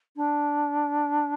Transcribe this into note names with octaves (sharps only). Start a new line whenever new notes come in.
D4